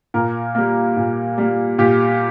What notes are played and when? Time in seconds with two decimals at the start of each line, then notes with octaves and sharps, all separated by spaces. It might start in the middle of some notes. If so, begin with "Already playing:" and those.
0.14 A#2 A#4
0.55 G3 A#3
0.97 A#2
1.38 G3 A#3
1.79 A#2 G4